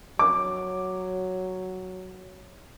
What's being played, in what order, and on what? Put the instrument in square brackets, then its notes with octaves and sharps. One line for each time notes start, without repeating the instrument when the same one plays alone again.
[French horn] F#3 [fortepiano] D6